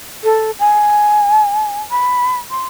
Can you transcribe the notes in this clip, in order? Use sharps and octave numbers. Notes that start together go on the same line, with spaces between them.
A4
G#5
B5
C6